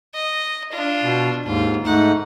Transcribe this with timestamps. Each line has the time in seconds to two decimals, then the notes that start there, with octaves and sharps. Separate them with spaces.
0.14 D#5
0.72 D4 F4
1.03 B2
1.45 D#2 G#2 F4
1.85 G#2 A3 D#4 F#5